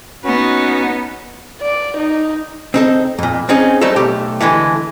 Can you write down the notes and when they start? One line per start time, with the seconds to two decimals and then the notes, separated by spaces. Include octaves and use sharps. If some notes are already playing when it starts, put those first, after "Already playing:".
0.24 B3 C#4 D#4 F#4
1.61 D5
1.97 D#4
2.74 C4 D#4 A4
3.19 F2 A#2
3.49 C4 C#4 D#4 G#4
3.81 F#3 G3 A3 D#4 A4 C5
3.96 B1 A3 G4
4.41 D3 E3 G#3 A3